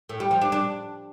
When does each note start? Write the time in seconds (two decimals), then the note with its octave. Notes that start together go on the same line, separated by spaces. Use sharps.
0.09 A2
0.20 G3
0.31 F3
0.41 D4
0.52 D4